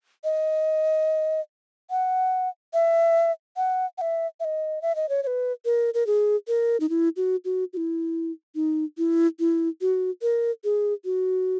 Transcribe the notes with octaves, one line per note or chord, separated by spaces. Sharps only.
D#5
F#5
E5
F#5
F#5
E5
E5
D#5
E5
D#5
C#5
C#5
B4
A#4
A#4
G#4
A#4
D#4
E4
F#4
F#4
F#4
E4
D#4
E4
E4
F#4
A#4
G#4
F#4